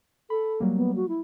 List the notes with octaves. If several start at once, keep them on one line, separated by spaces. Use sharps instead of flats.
A4 B5
F#3 G3 A#3
B3
F#4
E4